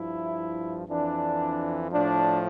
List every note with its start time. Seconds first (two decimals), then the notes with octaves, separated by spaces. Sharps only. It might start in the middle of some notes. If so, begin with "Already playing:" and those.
Already playing: G2 F3 E4
0.88 F2 E3 D4
1.92 A2 F3 D4